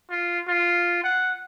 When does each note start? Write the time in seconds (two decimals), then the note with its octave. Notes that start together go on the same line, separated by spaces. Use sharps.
0.10 F4
0.48 F4
1.04 F#5